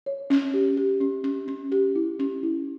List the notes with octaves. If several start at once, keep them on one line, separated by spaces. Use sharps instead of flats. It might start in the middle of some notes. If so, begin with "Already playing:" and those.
C#5
C#4
G4
G4
C#4
C#4
C#4
G4
E4
C#4
E4